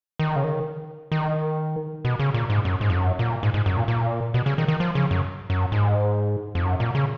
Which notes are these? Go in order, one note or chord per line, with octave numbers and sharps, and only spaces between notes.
D#3
C#3
D#3
D#3
B2
C#3
A#2
G#2
F#2
G#2
F2
F#2
A#2
G#2
G#2
F#2
A#2
A#2
B2
C#3
D#3
D#3
F3
C#3
F#2
F#2
G#2
F2
F#2
A#2
C#3